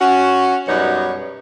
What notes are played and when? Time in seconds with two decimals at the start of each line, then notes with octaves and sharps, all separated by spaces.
0.01 C#4 F#4
0.68 F#2 B2 G3 D#4 C#5